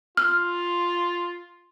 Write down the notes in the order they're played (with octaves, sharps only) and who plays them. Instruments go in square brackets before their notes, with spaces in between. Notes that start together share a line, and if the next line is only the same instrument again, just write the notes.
[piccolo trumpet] F4 [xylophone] F6